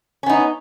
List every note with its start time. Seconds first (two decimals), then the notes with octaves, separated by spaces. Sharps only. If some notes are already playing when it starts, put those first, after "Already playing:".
0.23 C#4
0.26 B3
0.29 D#4